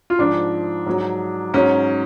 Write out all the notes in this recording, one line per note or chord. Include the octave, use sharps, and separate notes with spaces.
F4
G#2 F3 D4
G#2 F#3
G#2 F#3 C#4